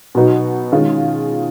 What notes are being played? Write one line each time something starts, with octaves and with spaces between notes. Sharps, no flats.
B2 F#3 B3 D#4 F#4
D#3 G#3 C#4 F4